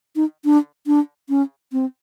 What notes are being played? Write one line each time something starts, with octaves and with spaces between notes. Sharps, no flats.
D#4
D4
D4
C#4
C4